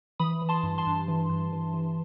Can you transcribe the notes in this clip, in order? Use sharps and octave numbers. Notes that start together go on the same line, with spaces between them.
E3 B5 D#6
E3
A5 C6
G2
A5 C6
G2
E3
G2
E3
E3